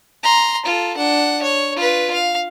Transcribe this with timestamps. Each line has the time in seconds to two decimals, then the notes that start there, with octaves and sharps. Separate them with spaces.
0.23 A#5 C6
0.65 F4 A4
0.97 D4 F#5
1.43 C#5
1.76 F4 B4
2.14 F5